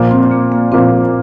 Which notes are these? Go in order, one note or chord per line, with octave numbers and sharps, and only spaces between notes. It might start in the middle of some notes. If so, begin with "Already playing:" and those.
Already playing: A#2 F3 A#3
C4
A#3
A#3
A#2 F3 A#3 C4